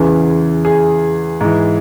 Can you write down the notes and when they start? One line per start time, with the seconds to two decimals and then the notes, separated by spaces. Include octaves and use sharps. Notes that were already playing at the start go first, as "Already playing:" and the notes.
Already playing: E2 C#3 E3 G#4
0.65 G#4
1.41 G#2 E3